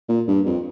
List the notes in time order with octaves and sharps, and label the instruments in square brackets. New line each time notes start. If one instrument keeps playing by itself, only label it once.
[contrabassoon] A#2
G2
F2